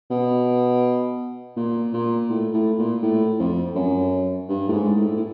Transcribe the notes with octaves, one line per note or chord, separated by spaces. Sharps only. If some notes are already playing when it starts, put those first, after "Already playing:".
B2
A#2
A#2
A2
A2
A#2
A2
F2
F#2
G2
A2
G#2
A2
A2